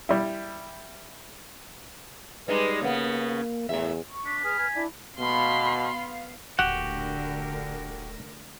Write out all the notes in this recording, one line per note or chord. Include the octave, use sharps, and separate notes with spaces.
G3 E4
G3 G#3 D#4 B4
C#3 A#3 B3
E2 A2 E5
C#6
D4 B6
G#4 B4 F6
G#5
D4 E4
B2 B3 F5 B5 C6
D#1 A1 D3 A3 F#4 G4 A#4 F#5